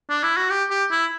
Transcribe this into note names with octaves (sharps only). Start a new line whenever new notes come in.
D4
E4
F#4
G4
G4
E4